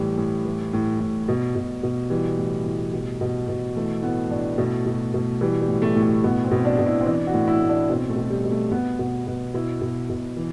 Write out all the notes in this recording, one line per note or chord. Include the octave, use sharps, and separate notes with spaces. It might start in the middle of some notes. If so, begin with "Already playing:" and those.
Already playing: A2 E3 G3
A2
E3
A2
A2
B2
B2
B2
E3 G3
A2
A2
B2
B2
B2
E3 A3
A2 B3
A2 D4
B2 A3
B2
B2
E3 G3
G3
A2
A3
A2
A3
B2 B3
C4
B2
D4
B2
E4
C4
E3 D4
F#4
A2
E4
A2
D4
B2 C4
A3
B2
G3
B2
A3
B2 B3
B2 B3
B2 B3
B2 E4
B2
B2
E3